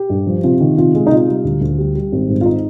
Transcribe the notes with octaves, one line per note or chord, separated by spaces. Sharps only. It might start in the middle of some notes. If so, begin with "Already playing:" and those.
Already playing: G4
G2
F3
C3 F4
D#3
C3 F4
G#3
D#4
C3 F4
G3
D2
D2
G3
G3
G#1
G#2
F4
D#4